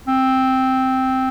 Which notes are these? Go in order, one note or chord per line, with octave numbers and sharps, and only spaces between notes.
C4